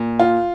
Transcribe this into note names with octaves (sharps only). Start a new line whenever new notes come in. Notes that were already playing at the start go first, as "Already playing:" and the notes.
Already playing: A#2
F4